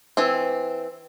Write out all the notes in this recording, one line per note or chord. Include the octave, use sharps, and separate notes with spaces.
E3 C4